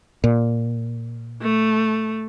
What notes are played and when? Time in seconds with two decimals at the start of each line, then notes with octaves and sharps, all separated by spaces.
0.24 A#2
1.42 A3